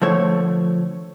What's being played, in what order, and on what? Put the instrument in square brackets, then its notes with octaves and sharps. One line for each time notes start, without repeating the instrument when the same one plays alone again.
[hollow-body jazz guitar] D3 F3 A3 C#5